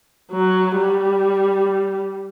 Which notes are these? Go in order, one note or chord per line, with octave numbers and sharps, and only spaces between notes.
F#3
G3